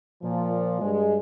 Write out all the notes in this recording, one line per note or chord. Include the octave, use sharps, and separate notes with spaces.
A#2 F3
G2 G#3